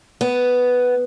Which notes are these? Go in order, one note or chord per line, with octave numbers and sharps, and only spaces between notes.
B3